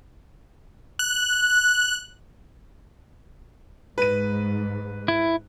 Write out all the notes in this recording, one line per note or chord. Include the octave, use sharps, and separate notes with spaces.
F#6
G#2 B4 D#7
E4